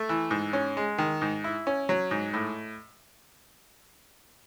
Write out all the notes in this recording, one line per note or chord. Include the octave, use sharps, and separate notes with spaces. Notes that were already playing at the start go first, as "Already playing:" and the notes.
Already playing: A3
E3
G#2
C#4
G#3
D#3
G#2
E4
C#4
F#3
G#2
A2